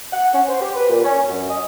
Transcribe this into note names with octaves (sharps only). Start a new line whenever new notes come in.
F#5
C#4
C5
G4
B4
A#2
C#4
F#2
D#5